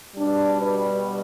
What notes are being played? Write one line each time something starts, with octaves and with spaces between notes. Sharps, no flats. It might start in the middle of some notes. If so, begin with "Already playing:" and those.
B2 G3 D4
B4